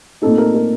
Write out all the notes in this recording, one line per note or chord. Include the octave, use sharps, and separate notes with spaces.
A#2 A3 C4 D#4 A4
A#4
A#4